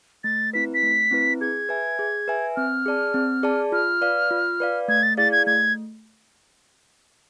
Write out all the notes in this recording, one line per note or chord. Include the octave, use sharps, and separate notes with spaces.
A3 A6
C4 E4 B4 B6
B6
A3
C4 E4 B4
G#4 G#6
B4 E5 G#5
G#4
B4 E5 G#5
C4 F6
G#4 D5 A5
C4
G#4 D5 A5
F4 F6
B4 D5 F5
F4
B4 D5 F5
A3 G#6
A6
E4 G#4 D5 F5 A6
G#6
A3 G#6